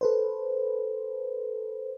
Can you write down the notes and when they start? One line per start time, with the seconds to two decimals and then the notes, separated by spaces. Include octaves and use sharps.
0.01 A4 B4 C5